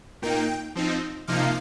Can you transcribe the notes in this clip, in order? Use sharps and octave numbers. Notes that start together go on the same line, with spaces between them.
A#2 A#3 D#4 G5
F3 C4 D#4
C3 F3 A#3 D#4 F5